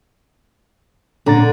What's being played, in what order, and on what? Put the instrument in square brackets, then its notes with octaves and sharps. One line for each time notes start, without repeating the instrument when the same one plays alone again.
[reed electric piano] A#2 A#5 A6 [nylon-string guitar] D3